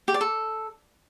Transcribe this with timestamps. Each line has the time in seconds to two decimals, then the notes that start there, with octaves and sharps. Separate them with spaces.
0.08 G4
0.14 D5
0.21 A4